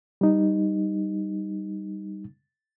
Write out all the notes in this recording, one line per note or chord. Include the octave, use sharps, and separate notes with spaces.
G3 D#4